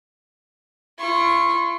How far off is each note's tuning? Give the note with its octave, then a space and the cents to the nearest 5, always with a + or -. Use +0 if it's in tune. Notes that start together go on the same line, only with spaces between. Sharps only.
F4 -40 C#6 -25